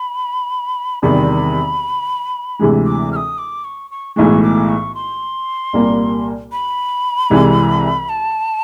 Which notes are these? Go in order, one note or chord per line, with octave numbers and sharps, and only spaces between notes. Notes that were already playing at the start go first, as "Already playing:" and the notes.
Already playing: B5
E2 C3 D#3 G3 B5
D2 C3 E3 G#3
D6
F6
D#6
D6
C#6
C#6
B1 A2 E3 G#3 C#6
D6
C#6
C6
C2 A#2 G3 A#3
B5
C2 C3 E3 G#3
A5